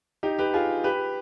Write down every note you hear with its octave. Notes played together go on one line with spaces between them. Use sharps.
D#4 G4
G4 B4
F4 G#4
G4 B4